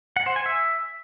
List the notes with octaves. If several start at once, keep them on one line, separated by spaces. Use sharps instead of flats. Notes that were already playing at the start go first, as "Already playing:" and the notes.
F#5
C5
G#5
E5